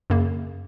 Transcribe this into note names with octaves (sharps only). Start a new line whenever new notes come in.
F#2 C#3 A#3